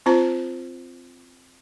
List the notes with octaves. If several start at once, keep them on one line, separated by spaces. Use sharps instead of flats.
C4 F4 C5 A#5